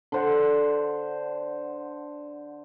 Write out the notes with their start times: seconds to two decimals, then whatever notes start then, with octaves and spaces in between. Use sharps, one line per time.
0.12 D3 C5 F#5